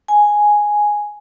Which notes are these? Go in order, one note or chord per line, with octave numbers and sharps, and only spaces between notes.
G#5